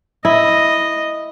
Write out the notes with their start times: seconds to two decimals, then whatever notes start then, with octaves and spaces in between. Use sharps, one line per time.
0.25 E4 D#5